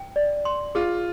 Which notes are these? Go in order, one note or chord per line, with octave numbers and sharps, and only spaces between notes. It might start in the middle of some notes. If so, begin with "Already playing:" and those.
Already playing: G5
D5
C6
F4 G#4